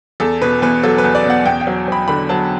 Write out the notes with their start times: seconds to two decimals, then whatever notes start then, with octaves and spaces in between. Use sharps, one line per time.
0.20 E2 A4
0.42 B2 B4
0.62 E2 B4
0.83 F#3 A4
0.98 B4
1.04 E2
1.15 D5
1.25 B2 F#5
1.45 E2 G5
1.61 G5
1.67 F#3
1.88 F#3 B5
2.08 D3 B5
2.29 F#3 A5